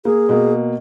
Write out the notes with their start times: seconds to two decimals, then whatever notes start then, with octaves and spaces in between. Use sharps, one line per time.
0.05 A#3 G#4
0.29 B2 A#3